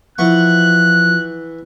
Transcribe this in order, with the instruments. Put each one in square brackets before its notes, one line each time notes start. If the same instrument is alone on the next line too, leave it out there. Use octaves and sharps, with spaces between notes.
[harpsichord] E3 F#5 C#6 [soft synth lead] F3 [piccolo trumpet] F#6